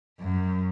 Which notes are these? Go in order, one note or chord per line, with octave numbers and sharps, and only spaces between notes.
F#2